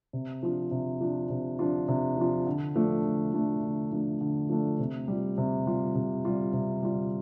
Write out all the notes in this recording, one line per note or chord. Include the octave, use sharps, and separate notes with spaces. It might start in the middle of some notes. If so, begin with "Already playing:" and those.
C3
F3 D4 F4
C3
F3 D4 F4
C3
F3 D4 F4
C3
F3 D4 F4
D3
F3 A3 D4
D3
F3 A3 D4
D3
F3 A3 D4
D3
F3 A3 D4
C3
G3 F4
C3
G3 F4
C3
G3 F4
C3
G3 F4